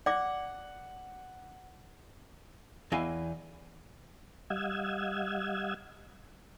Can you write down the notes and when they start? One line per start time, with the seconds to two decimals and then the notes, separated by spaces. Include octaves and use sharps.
0.06 D5 F#5 D6
2.92 E2 E4 D#5 F5 G#5
4.50 G3 D#5 F5 F#5 E6 G#6